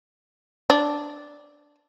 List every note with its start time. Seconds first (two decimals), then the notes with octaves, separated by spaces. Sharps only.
0.70 D4